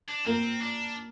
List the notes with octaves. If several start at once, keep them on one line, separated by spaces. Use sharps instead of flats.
D4
A#3 C4
D4